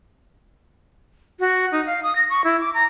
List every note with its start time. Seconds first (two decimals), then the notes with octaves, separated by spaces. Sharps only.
1.40 F#4
1.72 D#4
1.86 F5
2.03 D#6
2.16 A#6
2.30 C#6
2.44 E4
2.60 D6
2.74 A#5